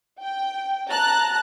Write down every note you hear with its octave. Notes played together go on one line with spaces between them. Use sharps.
G5
A5 A#5 F#6